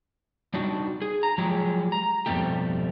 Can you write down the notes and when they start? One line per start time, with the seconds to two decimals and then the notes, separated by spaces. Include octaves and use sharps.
0.54 G3 D4 D#4 F#4
1.02 G#4
1.23 A#5
1.38 F3 F#3 G#3 G4 G#4
1.92 A#5
2.26 F2 G#2 B2 G3 A3 G4